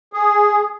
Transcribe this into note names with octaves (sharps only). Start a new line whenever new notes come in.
G#4